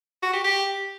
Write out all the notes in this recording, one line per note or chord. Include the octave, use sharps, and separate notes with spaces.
F#4
G4
G4